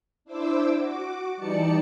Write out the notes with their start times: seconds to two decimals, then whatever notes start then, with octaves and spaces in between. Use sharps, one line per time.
0.25 D4 E4 C5 D6 E6
0.77 F#4 D6
1.37 E3 G3 D#4 D5 A5 C#7